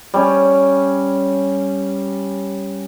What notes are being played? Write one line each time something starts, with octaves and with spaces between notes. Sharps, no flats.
G3 C#4